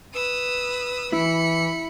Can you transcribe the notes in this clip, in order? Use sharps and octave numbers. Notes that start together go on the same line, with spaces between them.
B4 D#6 E6
E3 E4 B5 C#7